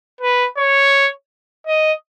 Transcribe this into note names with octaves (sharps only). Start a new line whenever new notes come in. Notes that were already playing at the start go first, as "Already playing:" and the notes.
B4
C#5
D#5